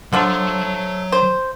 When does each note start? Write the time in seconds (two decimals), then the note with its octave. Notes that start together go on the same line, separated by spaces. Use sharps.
0.13 D3 F3 F#3 A3 A#5
1.12 C5